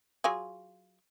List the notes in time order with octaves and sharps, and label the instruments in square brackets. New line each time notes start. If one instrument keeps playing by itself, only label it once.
[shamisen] F#3 F4 G#4